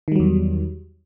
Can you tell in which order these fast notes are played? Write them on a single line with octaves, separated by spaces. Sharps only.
D#3 G3 F#3 E2